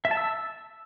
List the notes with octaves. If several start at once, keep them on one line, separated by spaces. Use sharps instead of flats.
E5
A5
E6